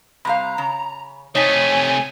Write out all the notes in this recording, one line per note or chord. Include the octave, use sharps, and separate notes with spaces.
C3 G3 F5 A#5 B5
C#3
C3 A3 D#4 C#5 G#5 B6